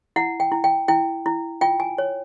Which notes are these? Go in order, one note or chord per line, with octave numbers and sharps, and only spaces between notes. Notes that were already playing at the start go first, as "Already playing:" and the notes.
E4 F#5
G5
E4
G5
E4 G5
E4
F4 G5
G#5
C#5